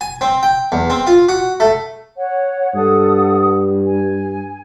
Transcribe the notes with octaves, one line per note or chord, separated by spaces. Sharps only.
G#5
C4
G5
E2
C4
F4
F#4
A3
C#5 F#5
G2 A4 F#5 D#6
G#5